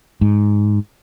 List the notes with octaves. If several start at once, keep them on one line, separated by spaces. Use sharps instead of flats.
G#2